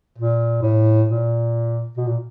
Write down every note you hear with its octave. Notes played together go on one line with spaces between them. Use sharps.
A#2
A2
A#2
B2
A#2